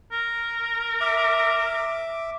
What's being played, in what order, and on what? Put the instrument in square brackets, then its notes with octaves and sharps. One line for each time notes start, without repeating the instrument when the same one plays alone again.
[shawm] A#4
[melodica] E5 D6